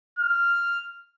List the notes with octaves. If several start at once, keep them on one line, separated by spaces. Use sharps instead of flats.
F6